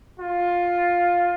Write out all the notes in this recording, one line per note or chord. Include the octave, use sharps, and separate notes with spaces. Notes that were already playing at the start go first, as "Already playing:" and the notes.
F4